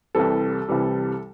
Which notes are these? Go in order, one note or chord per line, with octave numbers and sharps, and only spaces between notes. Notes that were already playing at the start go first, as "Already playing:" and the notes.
C2 C3 E3 G3 A4
C2 C3 E3 G3